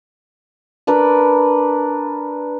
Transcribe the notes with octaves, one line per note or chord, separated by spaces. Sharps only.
D4 A#4 B4